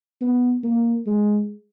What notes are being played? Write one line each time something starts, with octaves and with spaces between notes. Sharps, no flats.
B3
A#3
G#3